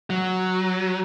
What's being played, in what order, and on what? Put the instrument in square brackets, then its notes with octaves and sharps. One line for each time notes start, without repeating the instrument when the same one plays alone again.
[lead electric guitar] F#3